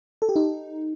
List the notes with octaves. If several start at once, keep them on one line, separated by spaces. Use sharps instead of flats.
A4
G4
D#4